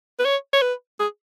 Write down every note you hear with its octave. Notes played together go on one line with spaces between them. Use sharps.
B4
C#5
C#5
B4
G#4